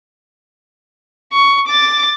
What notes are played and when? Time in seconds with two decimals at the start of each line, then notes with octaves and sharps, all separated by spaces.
1.33 C#6
1.67 D6 A6